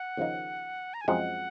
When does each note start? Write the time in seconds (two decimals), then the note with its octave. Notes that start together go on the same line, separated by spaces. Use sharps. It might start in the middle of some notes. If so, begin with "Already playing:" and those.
Already playing: F#5
0.17 D#2 C#3 F3 A#3 D#4
0.94 A#5
1.01 G#5
1.08 F#2 F3 G#3 C4 F#5